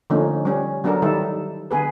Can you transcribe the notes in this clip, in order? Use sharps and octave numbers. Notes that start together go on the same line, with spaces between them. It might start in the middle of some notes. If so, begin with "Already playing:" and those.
D3 F3 A3 A#3 C#4 D#4
G3 C#4
F#3 B3 D4 A4 A#4
D#3 G3 D#4 E4 A4
D3 B3 G#4 B4